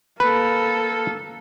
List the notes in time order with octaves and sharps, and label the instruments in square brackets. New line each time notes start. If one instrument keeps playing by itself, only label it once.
[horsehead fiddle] A#3 A4 [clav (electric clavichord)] B4